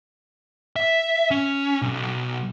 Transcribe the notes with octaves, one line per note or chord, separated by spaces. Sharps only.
E5
C#4
B1